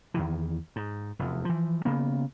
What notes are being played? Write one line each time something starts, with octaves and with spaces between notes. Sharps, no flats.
E2 D#3 E3
G#2
F1 E2
E3 F3
C#3 A#3 B3